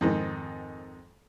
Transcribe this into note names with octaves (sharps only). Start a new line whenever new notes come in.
F2 G#2 D#3